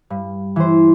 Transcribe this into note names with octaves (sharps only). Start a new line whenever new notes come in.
G2
E3 C5